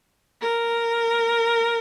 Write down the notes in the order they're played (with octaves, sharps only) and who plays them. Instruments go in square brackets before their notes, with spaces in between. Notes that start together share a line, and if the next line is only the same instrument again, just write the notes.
[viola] A#4